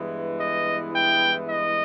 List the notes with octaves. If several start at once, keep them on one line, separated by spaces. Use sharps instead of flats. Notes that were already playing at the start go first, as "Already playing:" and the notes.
Already playing: G2 E3 G#3 B3 E4
D#5
G5
D#5